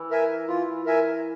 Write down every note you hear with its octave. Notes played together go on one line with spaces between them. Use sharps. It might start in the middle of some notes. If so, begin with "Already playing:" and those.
Already playing: E3
A#4 E5 G#5
E3 F4
A#4 E5 G#5